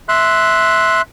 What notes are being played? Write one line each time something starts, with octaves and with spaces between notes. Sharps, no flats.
E5 C6 F#6